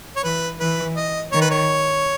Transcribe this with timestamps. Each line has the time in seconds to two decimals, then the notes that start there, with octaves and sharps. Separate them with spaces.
0.16 C#5
0.24 E3 B4
0.60 E3 B4
0.96 D#5
1.32 D#3 C#5
1.41 B4
1.51 C#5